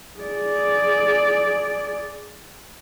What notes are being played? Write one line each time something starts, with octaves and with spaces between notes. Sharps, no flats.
G#4 D5